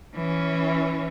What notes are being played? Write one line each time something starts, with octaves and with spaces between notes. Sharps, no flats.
E3 C#4